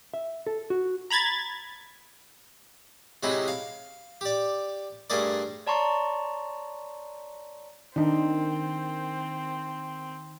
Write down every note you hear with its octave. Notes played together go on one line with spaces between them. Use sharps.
E5
A4
F#4
A#5 B5 G#6 A6
C3 F#3 G#3 D#4 E4
F5
G4 D5
G2 A3 G#4 A#4 D5
C#5 D5 A5 A#5 C6 C#6
D#3 C4 D4 D#4